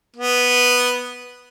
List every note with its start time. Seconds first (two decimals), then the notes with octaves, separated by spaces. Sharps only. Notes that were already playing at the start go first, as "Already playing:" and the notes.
0.17 B3